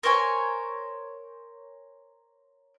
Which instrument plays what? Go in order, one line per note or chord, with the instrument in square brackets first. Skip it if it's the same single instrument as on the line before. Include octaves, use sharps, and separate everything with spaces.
[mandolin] A#4 C5 C#5 G#5